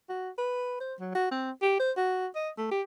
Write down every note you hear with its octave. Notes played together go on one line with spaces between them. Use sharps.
F#4
B4
C5
F#3
F#4
C4
G4
C5
F#4
D#5
A3
G4